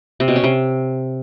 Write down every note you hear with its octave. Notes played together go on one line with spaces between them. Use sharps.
C3
B2
C#4
C3